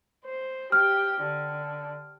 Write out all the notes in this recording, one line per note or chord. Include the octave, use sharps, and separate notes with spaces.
C5
G4 F6
D3